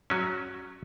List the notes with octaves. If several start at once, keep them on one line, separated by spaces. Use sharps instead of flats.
F#3 C#4